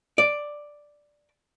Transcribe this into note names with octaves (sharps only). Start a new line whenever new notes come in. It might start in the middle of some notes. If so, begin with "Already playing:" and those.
D5